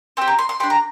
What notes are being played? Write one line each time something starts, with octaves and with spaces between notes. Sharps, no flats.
C4 G4 C5
A#5
C6
C6
D4 G4 C6
A#5